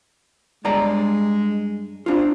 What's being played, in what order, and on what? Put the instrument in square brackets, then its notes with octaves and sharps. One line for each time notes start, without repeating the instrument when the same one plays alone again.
[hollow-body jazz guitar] G2 D5 A#5 [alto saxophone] G#3
[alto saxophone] C4 [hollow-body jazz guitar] D4 F4